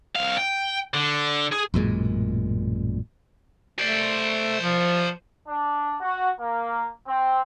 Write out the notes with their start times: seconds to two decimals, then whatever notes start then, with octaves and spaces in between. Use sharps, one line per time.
0.16 C2 F5
0.38 G5
0.94 D3
1.52 G#4
1.74 A1 F#2 A#2 G#3
3.79 A3 C5 D5
4.61 F3
5.48 D4
6.01 F#4
6.40 A#3
7.08 C4